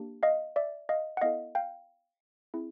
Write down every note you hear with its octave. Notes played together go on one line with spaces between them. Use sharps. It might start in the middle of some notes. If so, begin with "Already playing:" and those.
Already playing: A#3 D4 G4
D#5 F5
D5 E5
D#5 F5
F#5
B3 E4 A4 D#5 F5
F5 G5
C4 E4 G#4